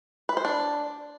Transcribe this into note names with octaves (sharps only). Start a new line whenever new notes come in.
B4
C5
D4